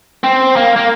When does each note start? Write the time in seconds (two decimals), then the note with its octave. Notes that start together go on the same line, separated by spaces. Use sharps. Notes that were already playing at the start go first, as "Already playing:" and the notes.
0.24 C4
0.56 A#3
0.76 A#3